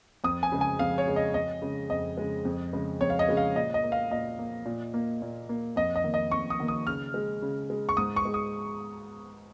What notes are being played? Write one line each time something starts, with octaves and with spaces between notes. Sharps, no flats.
F2 D#6
G#5
C#3 G#3
G#5
F2 F5
C#5
C#3 G#3
D#5
F2 D#5
C#3 G#3
F2 D#5
C#3 G#3
F2
C#3 G#3
F2 C#5
F5
D#5
C#3 G#3
F5
A#2 D#5
D#5
A#3
F5
A#2 D#5
A#3
A#2
A#3
A#2
A#3
F2 D#5
D#5
D#3 A#3
D#5
F2 C#6
D#6
D#3 A#3
D#6
C#3 F6
G#3
C#3
G#3
C#6
G#2 D#6
C#6
G#3
D#6